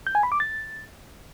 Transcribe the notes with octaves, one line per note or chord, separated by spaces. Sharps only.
G6
G#5
B5
D6
A6